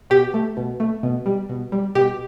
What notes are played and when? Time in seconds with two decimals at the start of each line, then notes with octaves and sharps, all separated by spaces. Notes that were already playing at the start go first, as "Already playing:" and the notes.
0.10 B2 G4
0.34 A3
0.57 B2
0.80 A3
1.03 B2
1.26 G3
1.49 B2
1.72 G3
1.95 B2 G4